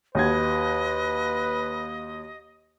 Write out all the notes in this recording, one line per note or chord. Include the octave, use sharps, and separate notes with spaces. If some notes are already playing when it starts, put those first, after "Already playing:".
D#2 F#4 B4 D#5 G#6